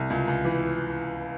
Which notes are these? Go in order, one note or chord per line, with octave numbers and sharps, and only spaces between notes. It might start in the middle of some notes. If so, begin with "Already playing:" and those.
Already playing: C2
C#2
C#2
E3